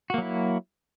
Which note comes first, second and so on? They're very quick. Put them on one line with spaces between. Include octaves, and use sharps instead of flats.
F#4 A#3 F#3 E4